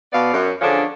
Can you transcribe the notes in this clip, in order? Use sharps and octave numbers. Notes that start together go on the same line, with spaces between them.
B2 B3 D5 F5
F#2
D3 F3 C#4 D4 G#4